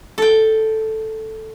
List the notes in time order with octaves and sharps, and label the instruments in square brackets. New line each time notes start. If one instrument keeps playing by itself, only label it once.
[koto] A4 G5